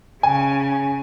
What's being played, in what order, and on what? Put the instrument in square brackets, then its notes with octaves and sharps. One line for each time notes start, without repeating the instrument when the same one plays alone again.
[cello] C#3 [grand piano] G#5